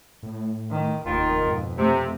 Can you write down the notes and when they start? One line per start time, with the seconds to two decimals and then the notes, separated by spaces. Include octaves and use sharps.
0.23 A2
0.71 D#3
1.05 F1 D#2 D#3 F4
1.45 F2 G#2 B2
1.79 C3 A3